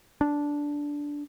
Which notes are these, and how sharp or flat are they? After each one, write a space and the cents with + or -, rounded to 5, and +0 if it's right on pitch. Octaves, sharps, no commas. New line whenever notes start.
D4 -10